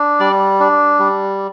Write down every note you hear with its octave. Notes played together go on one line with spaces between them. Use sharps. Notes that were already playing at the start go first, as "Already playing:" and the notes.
Already playing: D4
G3 D5
D4
G3